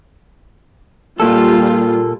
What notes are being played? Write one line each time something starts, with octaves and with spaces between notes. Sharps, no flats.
A#2 G3 A#3 F4 A4